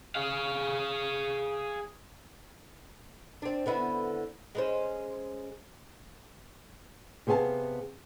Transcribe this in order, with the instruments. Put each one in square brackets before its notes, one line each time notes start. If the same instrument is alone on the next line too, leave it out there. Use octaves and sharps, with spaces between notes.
[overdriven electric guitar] G#4 F5
[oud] C4 D4
D3 B3 E4
G#3 C#4 C5
[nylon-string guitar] C3 B3 G#4 B4 F5 A5